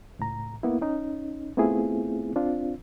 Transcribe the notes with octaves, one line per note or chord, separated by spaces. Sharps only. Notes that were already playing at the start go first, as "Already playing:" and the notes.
C#2 A2 A#5
A#3 B3 E4
C#4 D#4
A3 B3 C4 E4 F4 G#4
C4 D4 F4